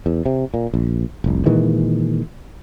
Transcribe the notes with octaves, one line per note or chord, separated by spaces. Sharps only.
E2
C3
A#2
A#1
F1 C2
A#2 D#3 E3 G#3